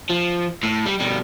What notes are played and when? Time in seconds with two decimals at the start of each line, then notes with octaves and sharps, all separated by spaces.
0.10 F3
0.63 A2
0.86 G3
1.00 B2 G3